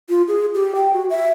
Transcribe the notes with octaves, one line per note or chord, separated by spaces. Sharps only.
F4
G#4
G4
G5
F#4
E5